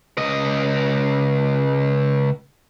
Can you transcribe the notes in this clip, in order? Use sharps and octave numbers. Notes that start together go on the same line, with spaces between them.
C#2 D#5